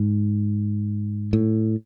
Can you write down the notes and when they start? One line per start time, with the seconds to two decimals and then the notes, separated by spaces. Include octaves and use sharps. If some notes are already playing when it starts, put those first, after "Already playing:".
Already playing: G#2
1.33 A2